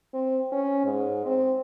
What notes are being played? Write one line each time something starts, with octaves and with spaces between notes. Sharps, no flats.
C4
C#4
G#2
C4